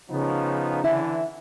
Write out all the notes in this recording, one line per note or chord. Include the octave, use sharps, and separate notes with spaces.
C#3 F3 B3 D#4
D3 E3 E4 E5